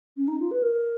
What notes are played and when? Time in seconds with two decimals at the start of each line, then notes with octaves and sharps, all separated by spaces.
0.17 C#4
0.28 D#4
0.40 F4
0.51 B4
0.63 A#4